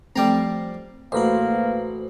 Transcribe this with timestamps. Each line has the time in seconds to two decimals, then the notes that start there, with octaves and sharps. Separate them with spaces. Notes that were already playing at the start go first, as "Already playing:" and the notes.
0.16 F3 G3 A3 C4 G5 A#5
1.12 A1 A#3 F#4 B4 C5